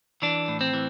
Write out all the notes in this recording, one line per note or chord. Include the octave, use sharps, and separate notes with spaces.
E3 D4
A2
C4
E3